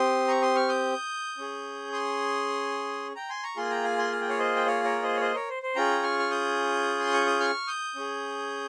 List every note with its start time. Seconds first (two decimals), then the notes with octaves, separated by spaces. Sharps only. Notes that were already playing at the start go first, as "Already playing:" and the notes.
Already playing: C4 G4 C6 D#6
0.28 A#5 C#6
0.42 C6 D#6
0.55 C#6 F6
0.69 D#6 G6
1.38 C#4 G#4
1.92 C6 D#6
3.15 G5 A#5
3.30 G#5 C6
3.43 A#5 C#6
3.56 A#3 F4 G#4 G#5 C6
3.71 G5 A#5
3.84 F5 G#5
3.98 G#5 C6
4.12 F5
4.21 G5
4.29 C#5 F5
4.39 C5 D#5
4.56 G5
4.66 C#5 F5
4.84 A#4 C#5
5.03 C5 D#5
5.16 C#5
5.21 C5 D#5
5.34 A#4 C#5
5.49 C5
5.63 C5
5.75 C#4 F4 G#4 G5 A#5
6.03 C#6 F6
6.19 F6
6.30 D#6 G6
7.00 C6
7.13 C#6
7.26 D#6
7.40 C#6 F6
7.67 D#6 G6
7.95 C#4 G#4